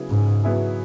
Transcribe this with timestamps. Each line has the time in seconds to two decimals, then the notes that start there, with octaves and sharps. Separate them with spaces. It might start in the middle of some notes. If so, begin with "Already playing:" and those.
Already playing: C#3 F#3 B3 E4 G#4
0.11 G#2 C#3
0.43 F#3 B3 E4 G#4